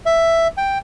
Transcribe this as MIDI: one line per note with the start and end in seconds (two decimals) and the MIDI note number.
0.06 0.48 76
0.57 0.78 79